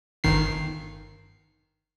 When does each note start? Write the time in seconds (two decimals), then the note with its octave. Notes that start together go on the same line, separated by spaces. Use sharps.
0.24 G1 D#3 C7